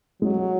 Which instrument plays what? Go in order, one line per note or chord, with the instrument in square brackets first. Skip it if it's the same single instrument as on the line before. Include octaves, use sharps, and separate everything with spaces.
[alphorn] F#3 [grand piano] G#3